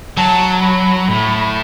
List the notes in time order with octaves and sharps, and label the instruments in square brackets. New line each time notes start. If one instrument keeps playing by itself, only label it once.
[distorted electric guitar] F#3 [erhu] A5
[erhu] B5
[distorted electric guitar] A2 [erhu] B5